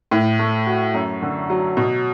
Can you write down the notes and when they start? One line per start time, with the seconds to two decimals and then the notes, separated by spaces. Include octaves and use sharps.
0.11 A2
0.39 A3
0.67 F#4
0.94 F#2
1.22 D3
1.50 F#3
1.77 B2